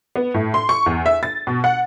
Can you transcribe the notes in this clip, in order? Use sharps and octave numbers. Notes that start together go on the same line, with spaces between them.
B3
A2
C6
C#6
E2
E5
A6
B2
F#5